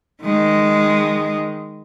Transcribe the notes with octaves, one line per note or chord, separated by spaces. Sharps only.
D#3 G#3